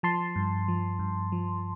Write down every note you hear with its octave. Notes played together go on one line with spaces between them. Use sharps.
F3 A5 C6
G2
F3
G2
F3